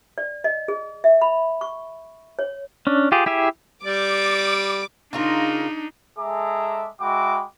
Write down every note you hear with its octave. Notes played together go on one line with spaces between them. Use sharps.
D5
D#5
G#4
E5
B5
C#6
C#5
C#4 D4
F4 G4 G#4
E4 G4 G#4 E5
G3 D5 D6
C#3 D4 D#4 F4 A#4
G#3 G#4 A4 E5 A#5 D6
G#3 F#4 E5 G5 B5 D6